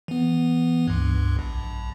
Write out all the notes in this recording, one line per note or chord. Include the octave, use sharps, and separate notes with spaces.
E3 B3
C#2 G2
A#1